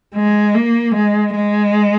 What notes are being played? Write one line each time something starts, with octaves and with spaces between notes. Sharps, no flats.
G#3
A#3
G#3
G#3